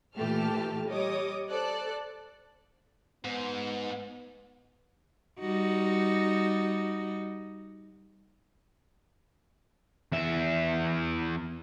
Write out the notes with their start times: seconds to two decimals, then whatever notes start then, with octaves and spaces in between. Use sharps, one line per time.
0.16 A#2 E3 A3 G4 A5 F6
0.88 G3 C#5 D#5 D6 D#6
1.50 A4 C5 D5 F#6
3.25 G#2 B3
5.39 G3 D#4 F#4
10.12 E2 E5